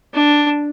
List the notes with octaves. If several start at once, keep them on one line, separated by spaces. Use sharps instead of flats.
D4